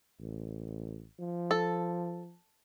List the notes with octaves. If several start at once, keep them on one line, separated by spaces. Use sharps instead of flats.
A1
F3
A4